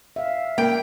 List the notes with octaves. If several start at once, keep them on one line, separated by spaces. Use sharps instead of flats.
E5 F5
A#3 G5